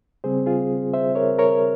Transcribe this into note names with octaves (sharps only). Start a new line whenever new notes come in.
C#3 G3 C4 G#4 C5
F4 G#4
C5 E5
A#4 C#5
A#4 C#5